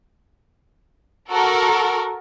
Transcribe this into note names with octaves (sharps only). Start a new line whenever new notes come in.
F#4 A4 A#4